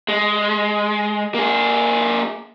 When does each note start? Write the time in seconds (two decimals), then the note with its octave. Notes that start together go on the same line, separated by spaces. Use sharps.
0.09 G#3
1.34 A#3 G#4